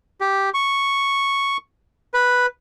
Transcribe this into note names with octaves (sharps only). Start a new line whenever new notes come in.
G4
C#6
B4